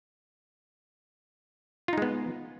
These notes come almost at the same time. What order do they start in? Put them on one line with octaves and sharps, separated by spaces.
F4 D#4 G#3 B3